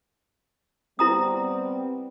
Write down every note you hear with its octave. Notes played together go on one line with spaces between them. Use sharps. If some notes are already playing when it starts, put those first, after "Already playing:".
G3 B3 C4 E4 A#5 D#6